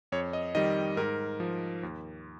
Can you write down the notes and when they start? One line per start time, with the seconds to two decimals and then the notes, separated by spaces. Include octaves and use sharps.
0.12 F2 C#5
0.33 D#5
0.55 D#3 G3 D#5
0.97 G#2 A#4
1.40 F3
1.83 D#2